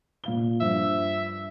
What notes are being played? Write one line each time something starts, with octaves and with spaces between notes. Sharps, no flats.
A#2 F5 G7
G2 F3 E5